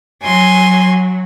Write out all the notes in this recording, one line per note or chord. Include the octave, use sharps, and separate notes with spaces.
F#3 G#5 C6